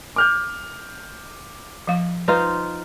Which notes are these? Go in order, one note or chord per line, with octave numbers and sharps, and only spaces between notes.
D6 F6 G6
F3 F5
D#4 F4 B4 C5